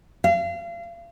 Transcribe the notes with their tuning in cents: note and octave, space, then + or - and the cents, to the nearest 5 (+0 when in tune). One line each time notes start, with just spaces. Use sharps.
F5 -35